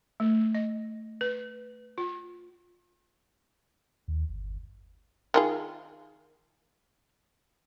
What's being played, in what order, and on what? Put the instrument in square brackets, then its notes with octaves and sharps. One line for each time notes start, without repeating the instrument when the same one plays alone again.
[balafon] A3
D#5
B4
F4
[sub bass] D#2
G1
[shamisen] D#3 F4 G#4